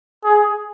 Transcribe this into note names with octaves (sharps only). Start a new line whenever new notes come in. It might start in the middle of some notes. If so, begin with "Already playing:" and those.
G#4